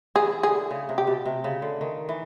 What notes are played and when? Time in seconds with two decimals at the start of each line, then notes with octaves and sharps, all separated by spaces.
0.15 E3 G#4
0.43 D3 G#4
0.71 C#3
0.89 C3
0.98 G4
1.07 B2
1.26 C3
1.44 C#3
1.62 D3
1.81 D#3
2.09 E3